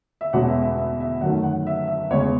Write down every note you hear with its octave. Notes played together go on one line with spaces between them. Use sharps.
E5
E2 B2 G#3 C#4 F#5
E5
E5
E5
E5
F#2 D#3 F#3 A3 F#5
F#5
E5
E5
E2 C#3 G#3 C#5